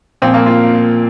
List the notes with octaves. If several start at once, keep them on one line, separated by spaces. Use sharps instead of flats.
A#2 F3 C4
A#3
F4